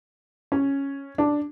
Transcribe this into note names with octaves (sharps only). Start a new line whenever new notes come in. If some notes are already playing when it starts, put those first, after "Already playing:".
C#4
D4